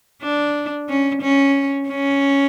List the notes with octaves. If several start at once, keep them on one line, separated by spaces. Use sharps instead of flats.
D4
C#4
C#4
C#4